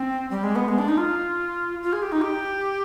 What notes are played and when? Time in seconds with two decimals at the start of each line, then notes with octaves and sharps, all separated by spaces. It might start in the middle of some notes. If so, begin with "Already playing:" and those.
Already playing: C4
0.31 G3
0.43 G#3
0.56 B3
0.68 G#3
0.78 D4
0.88 D#4
0.98 F4
1.83 F4
1.93 G#4
2.02 G4
2.12 D#4
2.22 G4